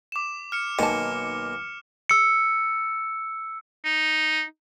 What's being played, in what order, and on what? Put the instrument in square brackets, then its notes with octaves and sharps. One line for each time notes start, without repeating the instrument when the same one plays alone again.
[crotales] D6 E7
F6 C#7 E7
[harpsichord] B1 A#3 G#5 [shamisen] D#3 A5
[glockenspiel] E6 C#7
[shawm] D#4